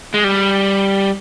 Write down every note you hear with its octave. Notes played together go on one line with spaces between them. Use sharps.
G#3
G3